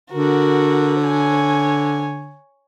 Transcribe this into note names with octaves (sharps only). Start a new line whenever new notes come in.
D3 F#4 A#4
C#5 G#5